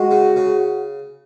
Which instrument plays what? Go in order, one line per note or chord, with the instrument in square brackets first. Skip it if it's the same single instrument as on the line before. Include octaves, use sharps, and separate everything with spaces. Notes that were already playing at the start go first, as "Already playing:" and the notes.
Already playing: [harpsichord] G#3 [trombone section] F#4
[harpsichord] C#3
C#3